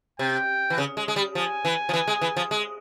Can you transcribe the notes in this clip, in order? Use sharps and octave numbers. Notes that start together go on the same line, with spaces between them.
C3 G5
E3
C#3
G#3
G#3
G3
F3 G#5
E3
F3
E3
G#3
E3
F3
G#3